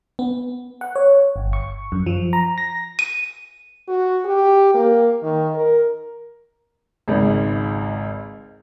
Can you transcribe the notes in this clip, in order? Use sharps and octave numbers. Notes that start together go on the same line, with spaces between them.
B3
F#5
C#5
G1
C#6
F#2
F3
A#5
A#6
D#7
F#4
G4
A#3
D#3
A#4
G#1 C#2 G#2